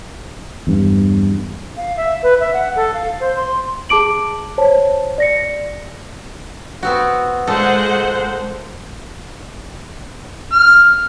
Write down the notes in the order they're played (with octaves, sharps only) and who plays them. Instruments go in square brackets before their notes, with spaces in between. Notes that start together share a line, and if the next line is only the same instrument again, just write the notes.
[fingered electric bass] E2 G2
[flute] F5
E5
B4
E5
F#5
A4
F5
C5
C6
[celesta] G#4 A5 D6 D7 F#7
C5 C#5 A5
D5 A#6 C#7
[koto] B3 C4 F#4
[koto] A#2 A4 D#5 [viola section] G#3 C5 F#5
[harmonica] F6